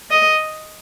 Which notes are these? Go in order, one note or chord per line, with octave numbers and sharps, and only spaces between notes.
D#5